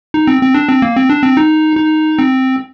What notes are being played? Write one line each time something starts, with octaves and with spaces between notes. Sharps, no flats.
D#4
C4
C4
D4
C4
A#3
C4
D4
C4
D#4
D#4
C4